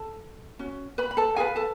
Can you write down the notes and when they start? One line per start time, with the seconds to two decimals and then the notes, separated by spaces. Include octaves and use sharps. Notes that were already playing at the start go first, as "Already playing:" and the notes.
Already playing: A4 A5
0.59 C#4 F#4
0.98 B4 B5
1.11 B5
1.17 A4 A5
1.36 F4 G#4 B4 G#5
1.56 A4 A5